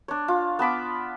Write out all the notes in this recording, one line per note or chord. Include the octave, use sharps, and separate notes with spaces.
D4 C#5
F4
B3 A5 B5 D6